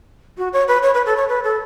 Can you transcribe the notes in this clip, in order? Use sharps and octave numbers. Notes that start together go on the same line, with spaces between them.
F#4
C#5
B4
C#5
B4
A4
C#5
B4
A4